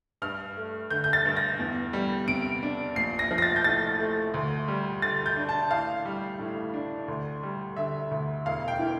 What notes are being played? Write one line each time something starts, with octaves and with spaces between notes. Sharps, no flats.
G2 F6
A3
D3 G6
G6
A6
G2
A#6
E2
G3
C3 D7
D4
A#1 C7
A#6
F3
A#6
A6
G6
A2 A6
A3
D2
G3
D3 A6
G6
D4
A5
A1 F5
G3
A2
D4
D2
G3
D3 E5
D2
E1 F5
G5
E3